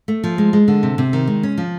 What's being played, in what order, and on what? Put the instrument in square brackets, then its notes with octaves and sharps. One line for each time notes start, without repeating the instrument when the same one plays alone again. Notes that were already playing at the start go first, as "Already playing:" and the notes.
[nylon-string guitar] A3
F3
G#3
G#3
D3
C3
C3
D#3
G#3
C#4
F3